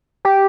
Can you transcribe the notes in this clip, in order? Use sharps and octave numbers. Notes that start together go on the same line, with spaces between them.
G4